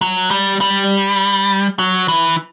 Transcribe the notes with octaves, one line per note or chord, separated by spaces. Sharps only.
F#3
G3
G3
F#3
E3